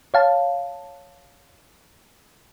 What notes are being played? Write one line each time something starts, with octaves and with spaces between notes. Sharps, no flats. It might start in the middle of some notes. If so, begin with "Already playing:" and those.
C#5 F5 A5